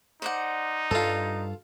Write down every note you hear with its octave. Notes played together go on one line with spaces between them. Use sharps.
D#4 C5 D5 F#5
G2 G3 F4 A4